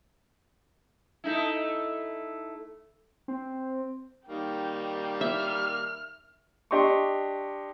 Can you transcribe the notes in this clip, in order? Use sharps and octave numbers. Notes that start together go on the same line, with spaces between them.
A3 D#4 E4
C4
D#3 G3 A#3 G5
E5 F6
D4 G4 D#5 C6 C#6